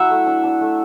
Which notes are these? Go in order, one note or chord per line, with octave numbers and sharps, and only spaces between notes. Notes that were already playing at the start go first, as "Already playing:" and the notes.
Already playing: F#3 E4 E5 F#5
A3
D4
D4
A3